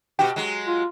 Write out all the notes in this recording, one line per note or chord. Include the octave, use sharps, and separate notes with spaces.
B2 F#4 G4 G5
F#3 G#3
F4